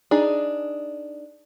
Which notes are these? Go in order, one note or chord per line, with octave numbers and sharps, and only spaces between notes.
D4 D#4 G#4